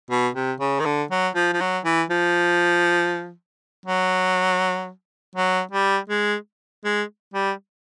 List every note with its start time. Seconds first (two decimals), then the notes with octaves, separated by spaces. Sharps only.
0.11 B2
0.35 C3
0.60 C#3
0.80 D#3
0.85 D3
1.11 F#3
1.36 F3
1.54 F3
1.61 F#3
1.85 E3
2.10 F3
3.86 F#3
5.35 F#3
5.72 G3
6.09 G#3
6.85 G#3
7.34 G3